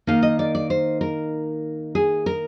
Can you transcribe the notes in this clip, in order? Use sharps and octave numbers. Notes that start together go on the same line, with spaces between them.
D#3 A#3 D#4 F5
D#5
D5
D5
C5
A#4
G#4
A#4